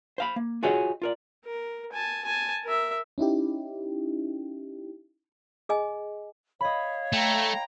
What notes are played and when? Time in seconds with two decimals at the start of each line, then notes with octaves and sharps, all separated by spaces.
0.18 C5 F5 B5
0.36 A#3
0.63 F4 F#4 G#4 C#5 D#5
1.02 F4 A#4 D5
1.45 A#4
1.92 G#5 A5
2.25 G#5 A5
2.64 A#4 E5
3.18 C#4 D#4 E4 G4
5.69 G#4 D#5 G#5
6.61 C#5 D#5 F5 B5
7.12 A3 G5 A#5